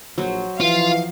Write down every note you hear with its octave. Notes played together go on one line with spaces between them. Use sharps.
A#1 F#3 C5
E3 F3 F4 F5